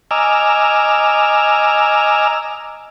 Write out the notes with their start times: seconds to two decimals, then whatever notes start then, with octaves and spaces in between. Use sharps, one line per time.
0.11 D#5 G#5 A#5 D6 E6 F6